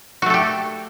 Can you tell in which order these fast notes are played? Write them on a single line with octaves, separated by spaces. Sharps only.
F#4 A3 A4 G4